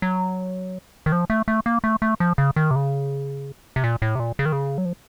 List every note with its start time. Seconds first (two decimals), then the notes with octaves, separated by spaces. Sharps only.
0.02 F#3
1.06 D#3
1.12 F3
1.30 A3
1.48 A3
1.66 A#3
1.84 A3
2.02 A3
2.20 F3
2.38 C#3
2.56 D#3
2.71 C3
2.76 C#3
3.76 C3
3.84 A#2
4.02 A2
4.15 C3
4.20 A#2
4.39 C#3
4.46 D#3
4.52 C#3
4.78 F#3
4.85 F3